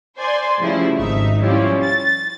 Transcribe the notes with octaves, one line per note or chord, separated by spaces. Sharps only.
C5 D5 G#5 C6
C#3 F3 G3 A3 E4
G#1 D#4 E5
F3 G3 C#4 E4 F4 G4
A6